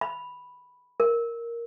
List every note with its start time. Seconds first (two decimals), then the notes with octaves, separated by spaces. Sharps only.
0.01 B5
1.00 A#4